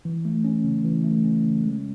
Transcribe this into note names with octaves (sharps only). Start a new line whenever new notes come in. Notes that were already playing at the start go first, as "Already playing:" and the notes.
E3
A3
C#4
C#3
E3
A3
C#4
C#3
G#3